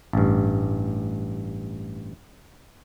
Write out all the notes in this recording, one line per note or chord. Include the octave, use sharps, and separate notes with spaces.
A1 G2